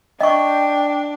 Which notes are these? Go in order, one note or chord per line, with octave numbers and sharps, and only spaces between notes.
D4 D#5 G5 C#6